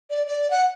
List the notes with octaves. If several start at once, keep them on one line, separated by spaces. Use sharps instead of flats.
D5
D5
F#5